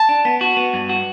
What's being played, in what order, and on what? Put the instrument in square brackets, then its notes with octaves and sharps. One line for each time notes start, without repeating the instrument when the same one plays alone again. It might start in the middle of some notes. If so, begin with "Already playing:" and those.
Already playing: [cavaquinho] A5
[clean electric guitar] D4
B3
F#4
B3
G2
F#4